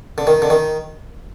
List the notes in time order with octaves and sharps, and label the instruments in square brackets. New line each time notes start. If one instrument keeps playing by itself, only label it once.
[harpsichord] D3
D#3
D3
D#3